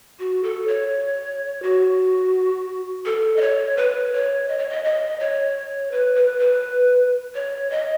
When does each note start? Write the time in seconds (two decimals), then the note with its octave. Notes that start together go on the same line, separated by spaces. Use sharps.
0.19 F#4
0.43 A4
0.67 C#5
1.62 F#4
3.06 A4
3.37 D#5
3.41 C#5
3.77 B4
4.13 C#5
4.48 D#5
4.58 C#5
4.69 D#5
4.84 D#5
5.20 C#5
5.91 B4
6.15 B4
6.39 B4
7.35 C#5
7.71 D#5